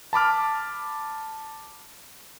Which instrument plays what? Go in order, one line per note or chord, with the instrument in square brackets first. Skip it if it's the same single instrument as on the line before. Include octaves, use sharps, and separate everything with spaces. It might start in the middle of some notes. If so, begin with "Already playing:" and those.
[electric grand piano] A5 B5 D6 F6